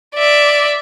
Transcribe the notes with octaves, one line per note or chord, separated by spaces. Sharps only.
D5 E5